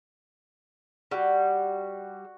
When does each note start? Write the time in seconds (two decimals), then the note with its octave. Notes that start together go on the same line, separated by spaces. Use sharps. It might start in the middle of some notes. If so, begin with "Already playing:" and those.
1.11 G3 F#4